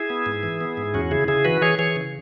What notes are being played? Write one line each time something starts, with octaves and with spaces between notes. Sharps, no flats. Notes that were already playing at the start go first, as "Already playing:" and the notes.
Already playing: E4 G#4
B3
G#2
E3
B3
G#2
E2 C#4 F#4
C#3 E4 G#4
C#3 E4 G#4
E3 F#4 B4
E3 G#4 C#5
E3 G#4 C#5
C#3